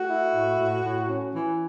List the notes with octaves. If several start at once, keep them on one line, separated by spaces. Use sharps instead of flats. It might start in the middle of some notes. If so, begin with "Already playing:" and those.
Already playing: A3 F#4
E4
A2
A2
A2
C#4
E3